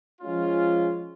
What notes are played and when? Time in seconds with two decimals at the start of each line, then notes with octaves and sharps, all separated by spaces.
0.22 F3 G#3 C#4 F4